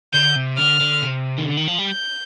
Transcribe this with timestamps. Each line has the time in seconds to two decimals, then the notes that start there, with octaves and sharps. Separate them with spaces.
0.14 D3 G6
0.36 C3
0.58 D3 F6
0.80 D3
1.02 C3
1.38 D#3
1.45 D3
1.57 D#3
1.68 F3
1.79 G3
1.90 G6